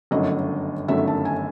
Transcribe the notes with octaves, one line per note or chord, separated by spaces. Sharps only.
G1 F#2 D#3 F#3 A3 D#5
G1 F#2 D#3 F#3 A3 E5
A5
G#5